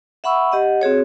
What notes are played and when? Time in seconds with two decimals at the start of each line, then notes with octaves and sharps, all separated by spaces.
0.24 E5 F#5 B5 C#6 E6
0.52 G4 D#5 F#5
0.81 C4 F#4 G#4 C#5